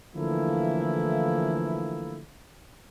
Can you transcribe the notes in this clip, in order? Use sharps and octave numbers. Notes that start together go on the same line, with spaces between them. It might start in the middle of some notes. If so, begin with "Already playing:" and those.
D3 E3 F3 A3 A#3 E4